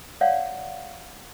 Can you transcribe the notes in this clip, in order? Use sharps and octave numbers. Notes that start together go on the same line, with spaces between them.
C#5 D5 F5 F#5